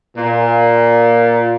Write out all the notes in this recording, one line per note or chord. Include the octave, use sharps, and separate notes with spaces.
A#2